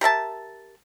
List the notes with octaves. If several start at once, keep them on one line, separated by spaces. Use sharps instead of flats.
G4 A#4 E5 A5